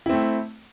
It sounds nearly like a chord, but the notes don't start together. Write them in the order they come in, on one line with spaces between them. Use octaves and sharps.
E4 C4 A3